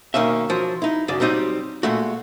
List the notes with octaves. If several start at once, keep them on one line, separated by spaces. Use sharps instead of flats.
B1 D#3 A#3 C#4 E5
F3 F#3
D#4 E4
F#2 C#3 D5
F#3 G3 C4 D#4 G4
A#2 G#3 A3 F#4